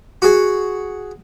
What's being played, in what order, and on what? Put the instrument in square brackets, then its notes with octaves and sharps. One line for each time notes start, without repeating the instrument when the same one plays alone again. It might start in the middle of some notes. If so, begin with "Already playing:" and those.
[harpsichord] F#4 G#4